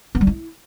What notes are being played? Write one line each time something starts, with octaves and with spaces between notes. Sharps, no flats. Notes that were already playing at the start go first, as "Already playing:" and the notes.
B3
G3
E4